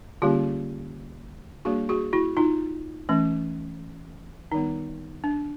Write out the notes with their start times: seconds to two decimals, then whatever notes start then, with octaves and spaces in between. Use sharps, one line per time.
0.22 D3 G3 A#3 C#4 F4 G4
1.65 G3 A#3 D4 F#4 G#4
1.89 F#4 G#4
2.13 E4 F#4
2.37 D#4 F4
3.09 E3 A3 C#4
4.52 D#3 G3 B3 D#4
5.24 D4